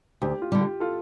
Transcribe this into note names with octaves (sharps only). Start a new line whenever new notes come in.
D2 G4
F4
D3 G3
G4
F4 A4